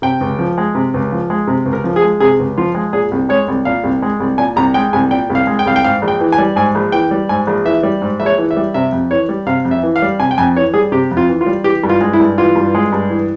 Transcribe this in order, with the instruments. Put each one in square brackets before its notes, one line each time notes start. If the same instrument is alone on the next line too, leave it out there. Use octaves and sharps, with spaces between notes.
[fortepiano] C3 G5
C#2
F3
G#3
C3
C#2
F3
G#3
C3
C#2
A#4
F3
G#4
G#3
C3 G#4
C#2
F3 F4
G#3
A#2 G#4
C2
G#3 C#5
C2
A#2 F5
C2
G#3
C2
A#2 G#5
C2 A#5
G#3 G5
C2 G#5
A#2 G5
C2
F5
G#3
G5
C2 F5
G5
G#2 F5
A#1
G5
E3
G#5
G3
G#2 G#5
A#1
E3 G5
G3
G#2 G#5
A#1
E3 E5
G3
G#2
A#1 E5
C#5
E3
E5
G3
C3 E5
F2
E3 C#5
G3
C3 F5
F2
E5
E3
F5
G3
C3 G#5
G5
F2 G#5
E3 C#5
G3 G#4
C3 G4
F2
F4
E3
F4
G3
E3 G4
G2
F4
G#3
E4
G2
E3 F4
G2
G#3
G2
E3